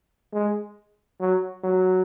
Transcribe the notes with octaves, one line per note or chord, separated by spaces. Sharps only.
G#3
F#3
F#3